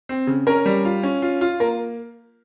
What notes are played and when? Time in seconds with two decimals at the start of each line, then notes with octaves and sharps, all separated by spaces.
0.09 C4
0.27 C#3
0.47 C#4 A#4
0.66 G3
0.85 F4
1.03 C#4
1.22 F4
1.41 F4
1.60 A#3 A#4